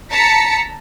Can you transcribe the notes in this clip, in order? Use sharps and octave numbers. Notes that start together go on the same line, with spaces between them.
A5 A#5 B6 C#7